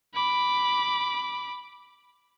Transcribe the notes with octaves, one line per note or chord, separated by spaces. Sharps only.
B5 D6